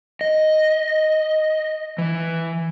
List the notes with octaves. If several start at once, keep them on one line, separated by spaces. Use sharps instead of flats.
D#5
E3